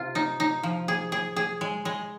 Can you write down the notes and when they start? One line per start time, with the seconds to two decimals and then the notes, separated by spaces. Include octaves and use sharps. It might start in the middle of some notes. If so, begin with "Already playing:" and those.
Already playing: C3 F4
0.15 D#4
0.40 D#4
0.63 F3
0.88 G#4
1.12 G#4
1.36 G#4
1.61 G#3
1.85 G#3